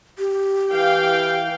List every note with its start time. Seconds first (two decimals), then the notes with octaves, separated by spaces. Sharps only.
0.18 G4
0.71 E3 F5 G5